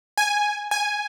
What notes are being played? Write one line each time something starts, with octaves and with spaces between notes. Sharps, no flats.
G#5
G#5